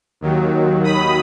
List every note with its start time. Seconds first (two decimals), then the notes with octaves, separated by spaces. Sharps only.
0.21 D#2 D#3 F#3
0.84 B5 D#6